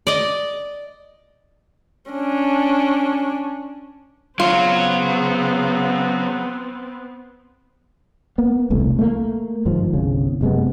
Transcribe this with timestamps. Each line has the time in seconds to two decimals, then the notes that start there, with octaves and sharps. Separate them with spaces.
0.07 D5 D#5
2.11 C#4 D4
4.40 C#3 F#3 B3 C4 F4 C#5
8.38 A#3 B3
8.70 E1 C2 A3
8.99 A3 A#3
9.65 G1 G#2 D#3 F3
9.93 G1 C2 C#3
10.41 F#1 C3 G#3 B3